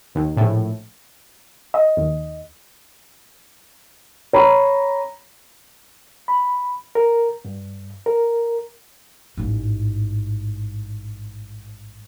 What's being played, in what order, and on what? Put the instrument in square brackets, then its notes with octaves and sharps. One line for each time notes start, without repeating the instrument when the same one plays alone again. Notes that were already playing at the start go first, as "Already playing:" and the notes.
[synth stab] D#2
A#1 A2
[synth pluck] D#5
D#2
[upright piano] C#5 A#5 B5
[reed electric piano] B5
A#4
G2
A#4
[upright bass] A1 G#2